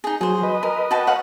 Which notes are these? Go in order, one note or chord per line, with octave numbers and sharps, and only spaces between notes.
D#4 G#4
F#3 G#4 C5
B4 D#5
A#4
F#4 G5 A5
C#5 F5 F#5